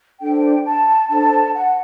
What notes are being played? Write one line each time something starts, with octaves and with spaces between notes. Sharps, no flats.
D4 A4 C5 G5
A5
D4 A4 C5 A5
F#5